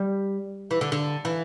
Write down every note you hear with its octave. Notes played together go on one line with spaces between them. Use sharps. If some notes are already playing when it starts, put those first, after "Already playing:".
Already playing: G3
E3
D3
D3
E3